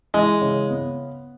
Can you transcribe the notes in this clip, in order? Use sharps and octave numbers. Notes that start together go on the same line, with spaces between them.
E3 G#3
C#3
B3